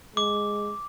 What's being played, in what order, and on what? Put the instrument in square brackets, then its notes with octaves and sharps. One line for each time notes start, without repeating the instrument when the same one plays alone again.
[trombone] G#3 [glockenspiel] D6